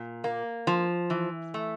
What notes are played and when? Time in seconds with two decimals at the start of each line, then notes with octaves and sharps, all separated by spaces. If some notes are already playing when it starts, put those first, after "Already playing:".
Already playing: A#2
0.24 A#3
0.67 F3
1.10 E3
1.54 A3